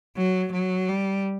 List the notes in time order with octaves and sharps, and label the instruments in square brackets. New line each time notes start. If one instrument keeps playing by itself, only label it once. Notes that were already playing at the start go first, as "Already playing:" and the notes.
[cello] F#3
F#3
G3